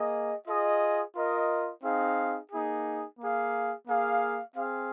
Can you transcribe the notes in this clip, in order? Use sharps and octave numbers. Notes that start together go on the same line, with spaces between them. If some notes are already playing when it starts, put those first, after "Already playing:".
Already playing: A#3 G#4 D#5
F4 G#4 D#5
F4 A#4 D#5
C4 D#4 G#4 F5
A#3 D#4 G#4
A#3 G#4 F5
A#3 G#4 F5
C4 G#4 F5